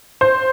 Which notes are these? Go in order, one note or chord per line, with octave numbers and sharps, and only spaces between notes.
C5